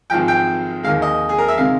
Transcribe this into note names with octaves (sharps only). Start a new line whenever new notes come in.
G#1 G#2 F3 G5
G5
D#2 D#3 G#3 F5
D#5
G#4
A#4
E5
C3 D#3 G#3 F5